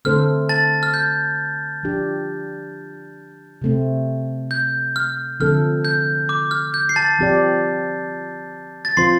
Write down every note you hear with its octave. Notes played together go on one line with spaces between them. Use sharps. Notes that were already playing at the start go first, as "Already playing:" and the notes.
D3 A3 C4 A4 C5 F6
A5 A6
F6
G6
F3 D4 G4
C3 A3 C4
G6
F6
D3 F3 A3 C4 A4 F6
G6
D6
F6
G6
C7
A5 A6
F3 C4 G4 D5
A6
F3 C4 F4 C5 C6 C7